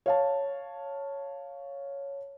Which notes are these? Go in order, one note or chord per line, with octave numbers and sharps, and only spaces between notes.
C#5 F5 A5